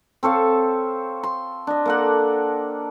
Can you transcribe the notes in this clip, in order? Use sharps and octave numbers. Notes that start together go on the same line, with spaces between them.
C4 A4 C#5 F5
C6
D4 D#5
A#3 A4 F#5